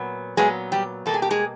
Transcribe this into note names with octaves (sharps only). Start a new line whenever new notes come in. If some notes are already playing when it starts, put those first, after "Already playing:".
Already playing: A#2 F#3 B3
A#2 F#3 G#3 B3 G#4
G3 G4
B2 G3 A#3 A4
G#4
G4
G#3 G#4